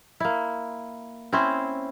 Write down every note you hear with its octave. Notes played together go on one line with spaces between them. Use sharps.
A#3 E4
C4 C#4 E4 C5